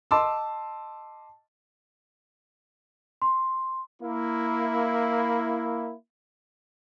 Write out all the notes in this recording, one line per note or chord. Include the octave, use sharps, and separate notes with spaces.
D#5 A5 C6 D6 E6
C6
A#3 E4